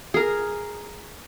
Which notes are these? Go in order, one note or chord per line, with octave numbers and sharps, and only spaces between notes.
G#4 A#4